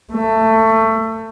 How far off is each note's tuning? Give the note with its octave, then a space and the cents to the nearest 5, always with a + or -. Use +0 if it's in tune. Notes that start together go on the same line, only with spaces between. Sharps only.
A3 +20